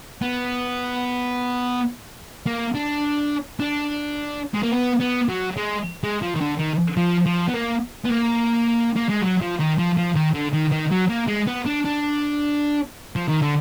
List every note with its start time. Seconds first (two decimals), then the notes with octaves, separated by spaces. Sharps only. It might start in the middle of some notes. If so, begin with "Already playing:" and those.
0.22 B3
2.47 A#3
2.75 D4
3.60 D4
4.54 G#3
4.63 A#3
4.72 B3
5.00 B3
5.29 F#3
5.57 G#3
6.04 G#3
6.22 F3
6.36 D#3
6.41 D3
6.59 D#3
6.97 F3
7.26 F3
7.48 B3
7.54 A#3
8.05 B3
8.10 A#3
8.96 A#3
9.09 G#3
9.22 F#3
9.41 F3
9.59 D#3
9.78 F3
9.97 F3
10.15 D#3
10.34 D3
10.54 D#3
10.72 D#3
10.92 F#3
11.09 A#3
11.28 G#3
11.47 B3
11.66 D4
11.85 D4
13.16 F3
13.28 D#3
13.42 D3